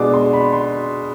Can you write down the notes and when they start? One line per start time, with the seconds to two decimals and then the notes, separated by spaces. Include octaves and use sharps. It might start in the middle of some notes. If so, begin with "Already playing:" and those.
Already playing: B2 G#3 D4 D6
0.14 C6
0.33 B5
0.53 C6